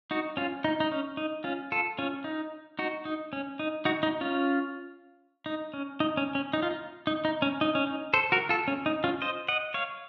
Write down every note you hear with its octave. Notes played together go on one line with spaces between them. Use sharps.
D#4 F#4
C#4 F4
D#4
D#4
C#4
D#4
C#4 F4
F4 A4
C#4 F4
D#4
D#4 F#4
D#4
C#4
D#4
D#4 F#4
D#4
C#4 F4
D#4
C#4
D#4
C#4
C#4
D#4
F4
D#4
D#4
D#4
C#4
D#4
C#4
D#4
A4 C5
F#4 A#4
F4 A4
C#4
D#4
C#4 F4
C5 D#5
D#5 F#5
C#5 F5